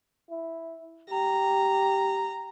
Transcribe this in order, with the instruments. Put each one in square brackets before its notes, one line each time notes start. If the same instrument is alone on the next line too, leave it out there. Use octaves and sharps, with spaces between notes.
[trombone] E4
[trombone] G4 [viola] A#5